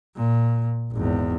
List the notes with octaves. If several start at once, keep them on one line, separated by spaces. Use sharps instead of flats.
A#2
G#1 E2